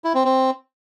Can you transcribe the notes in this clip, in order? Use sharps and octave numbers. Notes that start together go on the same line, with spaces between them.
E4
C4
C4